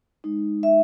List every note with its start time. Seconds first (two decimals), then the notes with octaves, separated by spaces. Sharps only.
0.24 G#3 D#4
0.63 E5